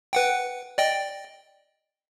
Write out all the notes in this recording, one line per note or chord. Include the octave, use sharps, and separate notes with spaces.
B4 F#5 G5
D5 D#5 G5